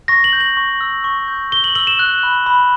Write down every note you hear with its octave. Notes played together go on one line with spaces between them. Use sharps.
C#6 A#6
F#7
G6
F#7
C#6
E6
C#6
G6
C#6 G7
F#7
E6 F#7
E7
F#6
B5
B5